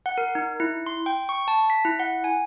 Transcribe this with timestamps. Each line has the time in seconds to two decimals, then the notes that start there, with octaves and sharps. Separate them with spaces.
0.06 F#5
0.18 A#4
0.35 D#4
0.60 E4
0.86 C6
1.06 G5
1.29 C#6
1.48 A5
1.70 B6
1.85 E4
2.00 F#5
2.24 G#5